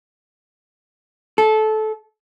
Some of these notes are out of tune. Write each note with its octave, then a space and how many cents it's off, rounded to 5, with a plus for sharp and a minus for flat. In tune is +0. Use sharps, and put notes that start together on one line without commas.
A4 -20